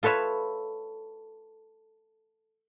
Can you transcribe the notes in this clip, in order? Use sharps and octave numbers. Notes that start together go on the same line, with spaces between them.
F4 A4 B4 C#5 E5